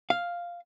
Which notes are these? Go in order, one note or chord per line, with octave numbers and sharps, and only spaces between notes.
F5